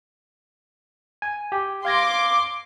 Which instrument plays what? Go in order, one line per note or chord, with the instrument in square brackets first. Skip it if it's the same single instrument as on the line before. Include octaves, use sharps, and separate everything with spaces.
[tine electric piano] G#5
G4
[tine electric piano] F5 G#6 A#6 [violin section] C6 D6